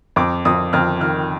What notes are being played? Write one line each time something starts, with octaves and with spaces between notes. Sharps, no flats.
F2 D6
F2 D#6
F2 F6
D#3 F6